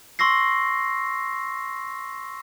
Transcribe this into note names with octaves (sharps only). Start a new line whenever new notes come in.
C6 C#6 E6 A#6 C7